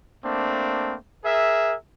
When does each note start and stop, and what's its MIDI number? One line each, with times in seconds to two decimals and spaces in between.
0.24 0.95 57
0.24 0.95 58
0.24 0.95 60
0.24 0.95 62
1.23 1.74 68
1.23 1.74 70
1.23 1.74 76